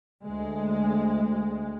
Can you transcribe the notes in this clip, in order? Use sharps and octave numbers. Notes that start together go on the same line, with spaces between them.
D2 G#3